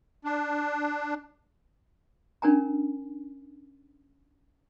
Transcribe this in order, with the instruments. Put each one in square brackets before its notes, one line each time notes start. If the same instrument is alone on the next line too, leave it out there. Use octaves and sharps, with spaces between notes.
[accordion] D4
[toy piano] C#4 D4 A#4 G#5 A#5